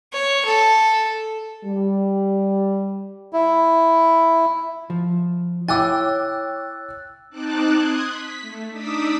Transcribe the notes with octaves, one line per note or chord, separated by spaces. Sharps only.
C#5
A4
G3
E4
F3
E4 C#5 G5 G#5 D6 E6 F#6 A6
C4 D#4 A5 D6 F#6
C6 D#6 F#6 G#6
B6
A3
D4 D#4 D5 D#6 E6 B6